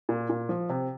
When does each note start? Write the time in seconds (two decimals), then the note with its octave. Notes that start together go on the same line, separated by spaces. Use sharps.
0.09 A#2
0.30 A#2
0.49 F3
0.69 C3